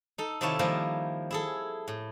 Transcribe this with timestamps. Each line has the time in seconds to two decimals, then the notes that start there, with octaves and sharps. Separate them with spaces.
0.18 D#4 A4
0.41 C3 D#3 E4 F4 C#5 A5
0.59 D#3 F3 G3 A#3 E4
1.31 E4 G#4 A4
1.88 A2